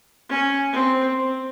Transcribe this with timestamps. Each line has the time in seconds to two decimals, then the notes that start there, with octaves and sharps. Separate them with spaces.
0.30 C#4
0.73 C4
1.17 C4